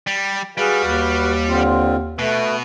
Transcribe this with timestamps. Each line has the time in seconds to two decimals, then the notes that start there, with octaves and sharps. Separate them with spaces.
0.07 G3
0.57 G3 F#4 G#4 B4 F5
0.85 D#2
1.48 D3 C4 F4
2.19 B2 A3 B4